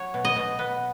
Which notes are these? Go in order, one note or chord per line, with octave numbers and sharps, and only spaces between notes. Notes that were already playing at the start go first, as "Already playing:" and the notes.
Already playing: F#3 C#5
B2
D#5
B2
B3